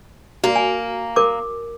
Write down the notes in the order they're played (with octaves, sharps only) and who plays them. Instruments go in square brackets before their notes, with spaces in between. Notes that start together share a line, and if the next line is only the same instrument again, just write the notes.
[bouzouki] A#3 [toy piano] F#4
[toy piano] G#5
A#4 D6